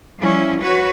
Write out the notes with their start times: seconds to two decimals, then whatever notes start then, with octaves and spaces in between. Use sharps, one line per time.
0.19 F3 G3 C#4 E4
0.61 F#4 B4 C#5